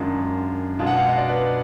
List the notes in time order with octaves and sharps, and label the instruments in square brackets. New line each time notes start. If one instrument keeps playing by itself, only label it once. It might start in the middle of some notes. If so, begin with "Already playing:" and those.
Already playing: [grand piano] F#2 D#3 G#3 D4 F4
B2 G#3 D4 F4
F#5
F5
D#5
D5
B4